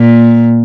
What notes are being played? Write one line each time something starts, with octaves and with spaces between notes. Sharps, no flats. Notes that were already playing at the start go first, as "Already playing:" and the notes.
Already playing: A#2